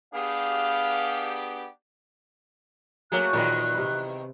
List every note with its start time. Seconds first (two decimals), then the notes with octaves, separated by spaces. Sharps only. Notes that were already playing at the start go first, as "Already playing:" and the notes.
0.14 B3 D4 G4 G#4 F5
3.12 F#3 A3 A#3 F#4 G#4 F#6
3.33 E2 A#2 D#3 B4 D#5
3.74 C3 B4